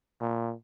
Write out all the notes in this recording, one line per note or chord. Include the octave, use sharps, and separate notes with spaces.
A#2